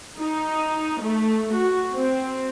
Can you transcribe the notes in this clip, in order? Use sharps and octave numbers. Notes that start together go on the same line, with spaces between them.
D#4
A3
F#4
C4